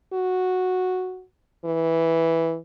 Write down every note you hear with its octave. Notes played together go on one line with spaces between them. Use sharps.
F#4
E3